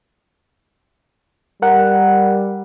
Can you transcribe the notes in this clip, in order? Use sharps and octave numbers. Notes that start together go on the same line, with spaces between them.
G3 A#4 F#5